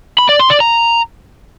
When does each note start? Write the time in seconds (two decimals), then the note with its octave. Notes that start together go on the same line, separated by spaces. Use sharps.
0.19 B5
0.29 D5
0.39 C6
0.50 D5
0.60 A#5